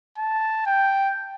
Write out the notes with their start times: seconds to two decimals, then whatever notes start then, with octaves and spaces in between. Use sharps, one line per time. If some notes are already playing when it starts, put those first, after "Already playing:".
0.18 A5
0.66 G5